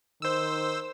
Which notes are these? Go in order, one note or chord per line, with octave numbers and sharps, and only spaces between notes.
D#3 C5 E6